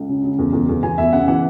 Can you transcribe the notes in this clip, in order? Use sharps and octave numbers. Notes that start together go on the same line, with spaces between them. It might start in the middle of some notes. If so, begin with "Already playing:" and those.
Already playing: C#2
C#3
C#3
E2
E2
E2
E2 G#5
E2 E5
C#3 F#5
E3 F#5